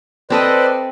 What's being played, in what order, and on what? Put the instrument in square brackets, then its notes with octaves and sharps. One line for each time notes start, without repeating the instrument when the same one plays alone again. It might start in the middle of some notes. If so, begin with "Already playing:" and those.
[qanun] C4 A4 D#5 [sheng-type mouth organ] B4 C5 D5